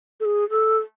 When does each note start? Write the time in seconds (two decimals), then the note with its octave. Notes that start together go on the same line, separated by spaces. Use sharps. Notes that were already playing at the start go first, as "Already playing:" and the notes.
0.20 A4
0.25 G#4
0.50 A4